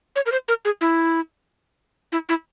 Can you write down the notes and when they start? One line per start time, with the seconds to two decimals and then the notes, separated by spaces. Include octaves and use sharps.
0.16 C#5
0.26 A#4
0.32 C5
0.48 A#4
0.65 G#4
0.81 E4
2.12 E4
2.29 E4